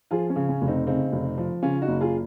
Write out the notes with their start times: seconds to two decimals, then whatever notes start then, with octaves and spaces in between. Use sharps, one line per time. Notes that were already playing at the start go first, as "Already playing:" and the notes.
0.11 F3 F4 G#4
0.30 C#4
0.36 C#3
0.49 C#4
0.62 F1
0.68 C4 D#4
0.87 C#3 C4 D#4
1.12 F1
1.38 F3
1.63 C#3 C#4 F4
1.81 D#4 F#4
1.88 F#1
2.01 F4 G#4